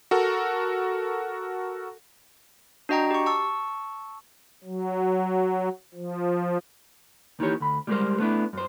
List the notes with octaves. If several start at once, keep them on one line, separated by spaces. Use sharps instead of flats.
F#4 A4 A#4
D4 F#4 D#5 G5 A#5
G4 C#6
A5 C#6 E6
F#3
F3
D#2 D#3 E3 G4 C#5
D2 B5
G3 G#3 G4 G#4 A#4 C5
A3 B3 D4 E4
F#2 C5